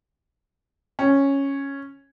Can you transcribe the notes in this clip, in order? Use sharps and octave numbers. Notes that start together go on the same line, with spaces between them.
C#4